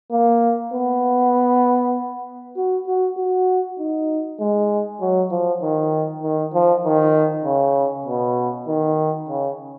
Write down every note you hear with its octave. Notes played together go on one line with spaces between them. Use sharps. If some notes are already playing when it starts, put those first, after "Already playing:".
A#3
B3
F#4
F#4
F#4
D#4
G#3
F#3
F3
D#3
D#3
F3
D#3
C#3
B2
D#3
C#3